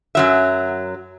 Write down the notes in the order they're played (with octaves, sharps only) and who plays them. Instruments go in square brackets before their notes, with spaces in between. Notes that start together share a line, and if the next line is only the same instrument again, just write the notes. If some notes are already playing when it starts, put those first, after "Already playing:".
[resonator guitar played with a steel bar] F#2 F#3 E5